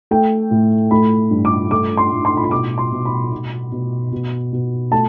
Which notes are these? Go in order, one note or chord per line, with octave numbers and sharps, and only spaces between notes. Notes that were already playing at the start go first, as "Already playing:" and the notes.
A3 G5
A2
A3 B5
G2
D6
A3 D6
C6
A2
C6
B5
C6
B2 D6
C6
B2
B5
B2
B2
B2
B2
A3 A5